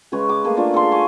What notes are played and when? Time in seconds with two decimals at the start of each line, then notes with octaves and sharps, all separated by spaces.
0.12 C#3 G#3 B4 C#5
0.29 D6
0.44 A3 A#3 G#4
0.57 D4 F4 D5
0.74 A4 C6
0.91 G#5 C#6 D6